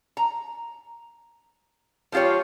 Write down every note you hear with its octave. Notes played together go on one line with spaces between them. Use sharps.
A#5
F3 G#3 F4 G4 C#5